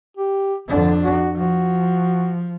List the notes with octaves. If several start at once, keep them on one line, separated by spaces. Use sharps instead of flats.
G4
F2 D3 D4
F#4
F3 F#4